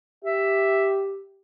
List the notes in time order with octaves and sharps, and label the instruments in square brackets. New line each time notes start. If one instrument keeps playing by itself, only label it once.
[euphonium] G4 [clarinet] E5